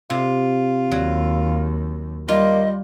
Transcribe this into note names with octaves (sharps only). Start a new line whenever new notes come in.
C3 F4
D#2 F#3
G3 A#3 F4 D#5